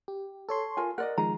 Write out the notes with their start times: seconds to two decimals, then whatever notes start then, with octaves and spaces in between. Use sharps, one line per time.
0.08 G4
0.49 A4 C#5 C6
0.77 F4 A#4 G#5
0.98 A#4 D5 D#5 F#5
1.18 D#3 F3 G#3 A#5